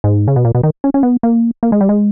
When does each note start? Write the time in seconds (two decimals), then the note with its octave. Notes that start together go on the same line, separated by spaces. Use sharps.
0.04 G#2
0.28 C#3
0.36 B2
0.45 A#2
0.55 B2
0.63 D#3
0.84 C#4
0.94 C#4
1.03 B3
1.23 A#3
1.63 A#3
1.72 G#3
1.81 G3
1.89 G#3